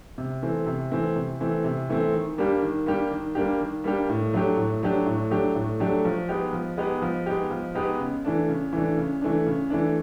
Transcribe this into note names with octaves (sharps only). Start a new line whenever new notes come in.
C3
E3 A3 C4
C3
E3 A3 C4
C3
E3 A3 C4
C3
E3 A3 C4
D#3
G3 A#3 D4 G4
D#3
G3 A#3 D4 G4
D#3
G3 A#3 D4 G4
D#3
G3 A#3 D4 G4
A2
F#3 A3 D4 G4
A2
F#3 A3 D4 G4
A2
F#3 A3 D4 G4
A2
F#3 A3 D4 G4
F3
G#3 B3 D#4 G4
F3
G#3 B3 D#4 G4
F3
G#3 B3 D#4 G4
F3
G#3 B3 D#4 G4
C#3
E3 A3 D4
C#3
E3 A3 D4
C#3
E3 A3 D4
C#3
E3 A3 D4